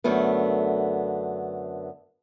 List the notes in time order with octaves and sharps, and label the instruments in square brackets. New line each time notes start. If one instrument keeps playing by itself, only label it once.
[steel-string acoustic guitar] F#2 D3 A3 B3